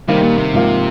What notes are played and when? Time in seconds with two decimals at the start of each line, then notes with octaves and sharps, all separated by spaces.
0.08 C3 D#3 G3 A#3
0.23 A#2
0.38 C3
0.53 G#2 F3 A#3